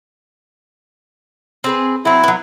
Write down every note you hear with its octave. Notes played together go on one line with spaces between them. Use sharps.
C4 G#4 B4
F#3 C4 E4
F#3 B3